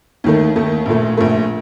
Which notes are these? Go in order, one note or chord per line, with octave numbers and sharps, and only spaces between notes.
D#2 D#3 A3
D#2 D#3 A3
A#1 A#2 A3
A#1 A#2 A3